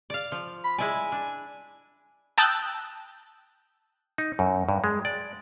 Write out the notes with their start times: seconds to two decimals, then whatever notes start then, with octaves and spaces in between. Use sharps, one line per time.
0.10 D5 F5
0.32 F3
0.64 B5
0.78 G#3 E4 D5 G#5
1.12 D4
2.38 G5 A5 D#6 E6 F#6 G6
4.18 D#4
4.39 F#2
4.69 G2
4.84 G#3
5.05 D5